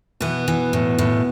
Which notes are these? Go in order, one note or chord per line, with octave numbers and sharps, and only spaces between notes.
B2 E3 B3
E3
A2
A2